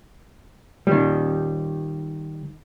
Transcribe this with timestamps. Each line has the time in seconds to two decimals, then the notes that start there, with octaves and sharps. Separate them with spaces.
0.87 D#3 G3